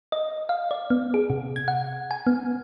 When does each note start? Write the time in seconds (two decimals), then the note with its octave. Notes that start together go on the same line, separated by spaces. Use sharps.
0.12 D#5
0.49 F5
0.71 D5
0.90 B3
1.14 G#4
1.30 C3
1.56 G#6
1.68 F#5
2.11 G#5
2.27 B3